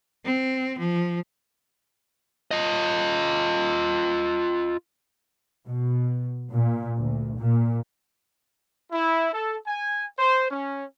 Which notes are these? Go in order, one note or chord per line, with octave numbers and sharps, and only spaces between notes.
C4
F3
F4 D#5
B2
A#2
D2
A#2
E4
A4
G#5
C5
C#4